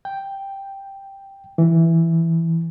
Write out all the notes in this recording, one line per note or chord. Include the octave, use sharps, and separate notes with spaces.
G5
E3